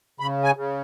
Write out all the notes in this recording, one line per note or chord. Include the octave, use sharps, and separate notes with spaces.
C#3 B5
G#5
C#3